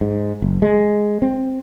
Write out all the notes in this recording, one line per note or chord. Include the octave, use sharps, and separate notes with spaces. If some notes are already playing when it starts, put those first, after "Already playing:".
G#2
F#1
G#3
C4